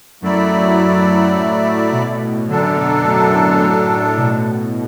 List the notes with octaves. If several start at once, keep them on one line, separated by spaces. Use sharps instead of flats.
F#2 F#3 A3 E4 D5
A2
B2
F#2 D3 F#3 D4 A4
B2
A2
A2
A2
B2